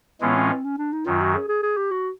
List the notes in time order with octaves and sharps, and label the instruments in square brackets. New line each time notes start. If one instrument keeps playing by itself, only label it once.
[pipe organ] A2 E3 G#3 C#4 F4 [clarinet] B3
[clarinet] C4
C4
C#4
D4
D#4
[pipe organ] F#2 D#3 F#3 [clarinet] F4
[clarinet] F#4
G#4
G#4
G#4
G4
F#4